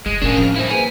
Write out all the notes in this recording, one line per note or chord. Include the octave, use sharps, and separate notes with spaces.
F#1 D#3 G#3
A2 D#3 C#4 D4 G#4 A#4
F2 F5
E4 C5
A#3 G#4 B4 G#5